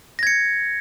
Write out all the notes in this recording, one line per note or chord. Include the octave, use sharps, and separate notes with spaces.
G#6 A#6 C#7